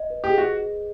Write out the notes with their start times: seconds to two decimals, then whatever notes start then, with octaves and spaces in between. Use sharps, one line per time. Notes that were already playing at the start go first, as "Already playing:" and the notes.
Already playing: D#5
0.10 B4
0.24 G4
0.30 G#4
0.38 F#4